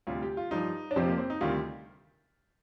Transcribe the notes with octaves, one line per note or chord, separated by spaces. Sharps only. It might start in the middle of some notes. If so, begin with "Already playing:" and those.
D2 C3 G3 F4
G4
F4
G2 F3 D#4
D4
F2 C3 F3 C4
A#3
C4
D#4
D2 C3 D#3 G3 F4